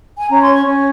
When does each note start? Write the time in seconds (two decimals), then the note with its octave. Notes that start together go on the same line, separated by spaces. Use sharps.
0.18 G#5
0.29 C#4 A#5
0.42 C6
0.47 C#5
0.54 C#6
0.66 C#4